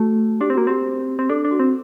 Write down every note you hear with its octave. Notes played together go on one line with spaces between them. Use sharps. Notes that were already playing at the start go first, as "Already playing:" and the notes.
Already playing: A3 F#4
D4 G4
C4
A#3 F#4
C4 G4
C4
D4 A4
D4
F#4
C4